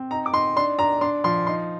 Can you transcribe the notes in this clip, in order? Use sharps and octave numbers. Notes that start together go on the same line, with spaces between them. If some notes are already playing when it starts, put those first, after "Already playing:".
Already playing: C4
D#4 A#5
D6
D#4 C6
D4 C6
D4 A#5
D4 C6
F3 C6
D#4 C6